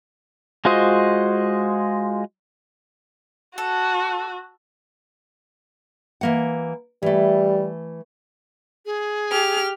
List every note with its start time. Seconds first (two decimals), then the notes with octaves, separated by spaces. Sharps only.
0.65 G#3 F4 F#4 C5 D#5
3.58 F#4 A4
6.21 E3 A#3 F#5
7.03 E3 G3 A3
8.86 G#4
9.31 G4 F6